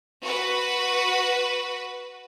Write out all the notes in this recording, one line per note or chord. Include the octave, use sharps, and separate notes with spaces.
F#4 B4